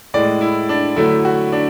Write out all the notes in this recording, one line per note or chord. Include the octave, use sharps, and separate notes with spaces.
A2 G#3 D5
E4
D4
D3 F#3 A3 E4
F#4
D4